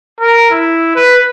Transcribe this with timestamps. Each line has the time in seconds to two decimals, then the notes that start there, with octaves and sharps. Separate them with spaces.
0.19 A#4
0.51 E4
0.96 B4